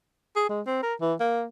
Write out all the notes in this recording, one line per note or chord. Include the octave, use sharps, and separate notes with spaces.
G#4
G#3
C4
A#4
E3
A#3